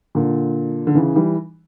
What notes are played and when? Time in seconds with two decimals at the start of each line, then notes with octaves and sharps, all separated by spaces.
0.15 A#2 D3
0.87 D3
0.95 C#3 E3
1.15 E3 G3